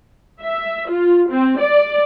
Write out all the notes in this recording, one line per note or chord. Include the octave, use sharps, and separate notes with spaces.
E5
F4
C4
D5